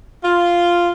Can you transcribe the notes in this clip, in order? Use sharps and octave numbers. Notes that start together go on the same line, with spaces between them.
F4